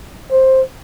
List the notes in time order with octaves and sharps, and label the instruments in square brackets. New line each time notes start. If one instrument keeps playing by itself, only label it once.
[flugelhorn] C5